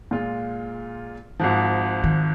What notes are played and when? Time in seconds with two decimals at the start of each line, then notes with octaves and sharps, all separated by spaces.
0.11 A#2 G#3 F4
1.40 G#1 G#2 F3
2.04 D#3